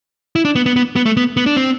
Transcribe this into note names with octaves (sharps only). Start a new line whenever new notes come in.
E4
D4
B3
B3
B3
B3
A3
B3
B3
D4
C4